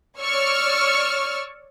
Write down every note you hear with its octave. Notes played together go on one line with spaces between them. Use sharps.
C#5 D5 C#6 E6 F6